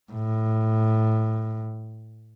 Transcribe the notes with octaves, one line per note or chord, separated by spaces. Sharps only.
A2